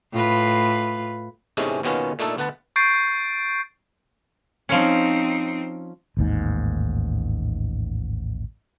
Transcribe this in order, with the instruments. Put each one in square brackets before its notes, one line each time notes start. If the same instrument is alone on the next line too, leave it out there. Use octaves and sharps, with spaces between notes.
[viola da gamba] A2 F4 B4
[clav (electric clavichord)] E2 G#2 C3 G#3 A3 C#4
D#2 B2 D#3 B3 C#4 F4
A#2 A3 D4 D#4 A4
D2 B3 B4 F#5 A5
[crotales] C#6 G6 A6 C7 D7
[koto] F3 C#4 [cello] C4 D#4
[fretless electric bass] A1 D#2 G#2